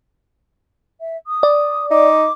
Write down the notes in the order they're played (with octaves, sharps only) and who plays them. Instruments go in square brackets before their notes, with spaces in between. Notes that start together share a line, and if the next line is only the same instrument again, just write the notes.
[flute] E5
D#6
[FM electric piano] D5
[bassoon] D#4 [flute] D6